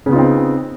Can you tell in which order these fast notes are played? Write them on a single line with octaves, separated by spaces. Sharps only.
C#3 B3 F4 D#4 C4